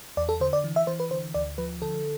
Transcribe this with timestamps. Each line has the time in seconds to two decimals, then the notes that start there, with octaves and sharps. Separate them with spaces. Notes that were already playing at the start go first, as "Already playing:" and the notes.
0.17 E2 D5
0.29 A4
0.41 D3 C5
0.53 D5
0.64 E3
0.76 E5
0.87 E3 C5
1.00 B4
1.11 D3 C5
1.34 D2 D5
1.58 F3 B4
1.82 D3 A4